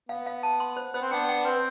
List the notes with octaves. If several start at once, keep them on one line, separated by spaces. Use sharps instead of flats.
B3 F5
F5
A5
C6
C5
B3 C5
C4
B3 D4 G5
G5
C4 B4